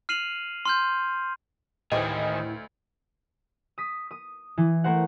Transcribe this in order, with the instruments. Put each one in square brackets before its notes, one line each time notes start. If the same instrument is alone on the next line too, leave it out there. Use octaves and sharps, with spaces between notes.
[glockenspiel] F6 C7 D#7 F7 F#7
C6 F6 G6
[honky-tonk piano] D2 C5 [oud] A2 E3 G4 [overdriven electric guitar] D#3 G#4 [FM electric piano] D#5
[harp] D#6 B6
D#6
E3
A3 A#4 C5 F#5